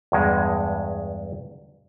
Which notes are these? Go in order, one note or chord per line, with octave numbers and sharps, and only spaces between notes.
E2 G2 G#3